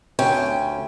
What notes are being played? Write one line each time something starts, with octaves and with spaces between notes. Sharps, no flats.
D2 C#4 G5